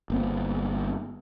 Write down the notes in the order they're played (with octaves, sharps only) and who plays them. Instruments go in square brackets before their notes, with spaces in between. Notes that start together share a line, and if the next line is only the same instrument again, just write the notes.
[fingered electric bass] G1 A#3 C4